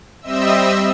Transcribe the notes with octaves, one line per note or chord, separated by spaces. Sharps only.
G3 C4 D#5 E5 E6